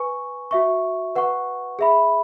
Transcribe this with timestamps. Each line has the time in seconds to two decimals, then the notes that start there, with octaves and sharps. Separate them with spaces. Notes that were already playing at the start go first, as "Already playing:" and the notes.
Already playing: B4 G#5 C#6
0.51 F#4 E5 C#6
1.16 B4 F#5 C#6
1.79 G#4 E5 B5